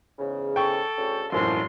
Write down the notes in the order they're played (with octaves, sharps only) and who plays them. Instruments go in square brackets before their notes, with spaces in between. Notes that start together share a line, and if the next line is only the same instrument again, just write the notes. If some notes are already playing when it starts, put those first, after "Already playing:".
[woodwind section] E2 G#2 C#3
[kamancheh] A4 [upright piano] G5 C#6
[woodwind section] D2 C#3
[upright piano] E1 F#2 A2 [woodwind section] F3 F#3 [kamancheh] C6